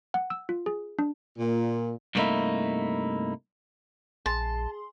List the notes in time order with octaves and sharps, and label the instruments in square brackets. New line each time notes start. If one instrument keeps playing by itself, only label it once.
[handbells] F#5
E6
F4
G#4
D4
[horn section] A#2
[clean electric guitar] G2 C3 A3 A#3 D#4 E4
[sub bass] A#1 [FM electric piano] G#4 C6 [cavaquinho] A5